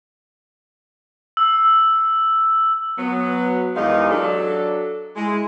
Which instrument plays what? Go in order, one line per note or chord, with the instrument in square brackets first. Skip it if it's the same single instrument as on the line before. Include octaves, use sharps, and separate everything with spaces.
[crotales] E6
[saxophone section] F#3 B3
E2 D#3 G#3 D#4 G4 F5
F#3 D4 A4
G#3 E4